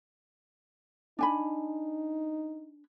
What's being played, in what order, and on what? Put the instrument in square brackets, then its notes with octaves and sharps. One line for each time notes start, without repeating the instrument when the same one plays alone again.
[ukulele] D4 G#5 B5 [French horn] D#4